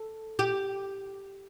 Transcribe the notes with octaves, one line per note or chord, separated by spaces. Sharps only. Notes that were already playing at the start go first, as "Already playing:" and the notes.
Already playing: A4
G4